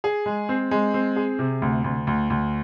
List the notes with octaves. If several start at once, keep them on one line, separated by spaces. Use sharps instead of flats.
G#4
G#3
C4
G#3
C4
G#4
C3
D2
D2
D2
D2